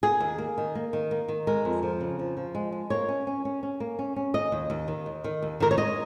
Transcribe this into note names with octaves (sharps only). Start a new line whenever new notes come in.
A#3 G#4
D#2
A#3
D#3
A#3
D#3
A#3
D#3
G#3 A#4
F2
F3
C#3
F3
F3
G#3
G#3
A#3 C#5
C#4
C#4
C#4
C#4
A#3
C#4
C#4
D#2 D#5
D#2
D#2
D#3
D#2
D#3
D#2
D#3 A#4
C#5
G#3 D#5